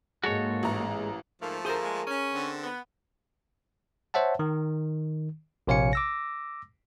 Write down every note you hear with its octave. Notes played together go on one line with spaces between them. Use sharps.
G#2 G#3 A#3 F#4 A4 C#5
A1 A#5
G#2 F3 A3 A#3
D2 G#4 A#4 C5
G#3 A#3
C#4
D3 C4
B3
C5 C#5 E5 F#5 A5
D#3
A#1 C3 C#5 F5 G#5 C#7
D6 E6 A#6